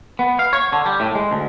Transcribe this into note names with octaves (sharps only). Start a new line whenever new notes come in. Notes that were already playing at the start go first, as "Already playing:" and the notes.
B3
F5
C#5
D3
G3
A2
G#3
D2